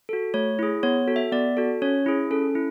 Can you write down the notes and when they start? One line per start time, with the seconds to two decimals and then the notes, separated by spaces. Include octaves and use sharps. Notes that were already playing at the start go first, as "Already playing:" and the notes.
0.09 F#4 A4
0.34 A3 C#5
0.59 E4 G#4
0.83 B3 C#5
1.08 F#4 A4
1.16 E5
1.32 B3 D5
1.57 F#4 A4
1.82 C#4 C#5
2.06 E4 G#4
2.31 C#4 A4
2.55 E4